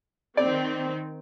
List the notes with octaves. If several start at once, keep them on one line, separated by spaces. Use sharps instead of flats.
D#3 C4 D5